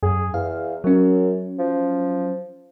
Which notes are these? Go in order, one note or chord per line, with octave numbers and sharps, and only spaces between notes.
F#2 G#4
E2 F5
F#2 F#3 C#4
F3